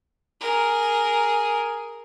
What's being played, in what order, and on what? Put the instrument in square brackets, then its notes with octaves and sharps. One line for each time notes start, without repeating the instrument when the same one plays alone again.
[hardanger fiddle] G#4 A#4